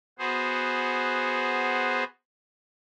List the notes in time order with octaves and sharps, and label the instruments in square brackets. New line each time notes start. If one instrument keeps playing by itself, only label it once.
[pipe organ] B3 F#4 G#4 C5